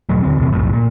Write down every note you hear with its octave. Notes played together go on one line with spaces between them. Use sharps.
E2 B2 F#3 A3
D#2 D3 C4
E1 E2 C3
B1 F2 A2
A#2